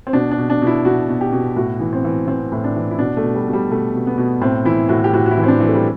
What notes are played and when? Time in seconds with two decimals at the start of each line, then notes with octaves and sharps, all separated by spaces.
0.07 C4
0.13 B2 D4
0.31 D4
0.38 B2
0.50 D4
0.62 B2
0.67 E4
0.85 B2 F#4
1.09 B2
1.21 G4
1.32 B2
1.56 A2 F#4
1.80 E3
1.93 C4
2.05 E3
2.27 E3 C4
2.52 A2
2.64 D4
2.76 E3
2.91 E4
2.99 B2 D4
3.17 A3
3.23 B2
3.35 G3
3.47 B2
3.53 G3
3.71 B2 A3
3.95 B2
4.07 B3
4.18 B2
4.41 A2 C4
4.65 E3 E4
4.89 A2 F#4
5.04 G4
5.13 A2 F#4
5.26 F#4
5.31 E4
5.37 E3
5.44 C4
5.48 D4
5.60 E3
5.67 A3
5.74 G3